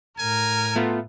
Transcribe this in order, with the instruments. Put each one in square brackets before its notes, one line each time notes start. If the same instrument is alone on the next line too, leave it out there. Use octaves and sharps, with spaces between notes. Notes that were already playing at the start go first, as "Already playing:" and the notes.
[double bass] A2 [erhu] A#4 [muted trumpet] G#5
[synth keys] A3 B3 F4